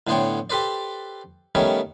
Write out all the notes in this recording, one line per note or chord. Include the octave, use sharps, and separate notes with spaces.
A2 D3 B3 C5 C#5 G5
G4 A4 B4 C5 D5
D#3 G3 A3 B3 C#4 C#5